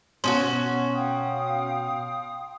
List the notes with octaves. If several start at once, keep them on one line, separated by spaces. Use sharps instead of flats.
B2 C#4 D#4 F#4 A5 C6
F5 G5 D#6